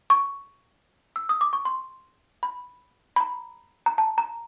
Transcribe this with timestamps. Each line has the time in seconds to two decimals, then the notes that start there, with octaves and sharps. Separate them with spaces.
0.10 C#6
1.16 E6
1.29 D#6
1.41 D6
1.53 C#6
1.65 C6
2.43 B5
3.16 B5
3.21 A#5
3.86 A#5
3.98 A5
4.18 A#5